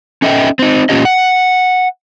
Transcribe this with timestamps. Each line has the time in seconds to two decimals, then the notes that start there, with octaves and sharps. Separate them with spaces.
0.22 C#4 A4 D#5 E5 G5
0.59 C4 D#4
0.89 E2 A#2 C#4 F4 G4 D#5
1.05 F#5